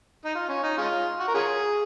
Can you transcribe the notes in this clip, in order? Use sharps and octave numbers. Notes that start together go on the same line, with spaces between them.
D#4
F4
C#4
D#4
G#3 C#4 F4
F#4
A#4
C#4 F4 G#4